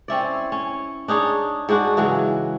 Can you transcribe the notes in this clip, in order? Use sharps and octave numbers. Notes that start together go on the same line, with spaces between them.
C4 C#4 E4 D5
C#4
D4 D#4 G#4 C#5
G#2 G#3 D4 F#4
C#3 E3 F#3 G#3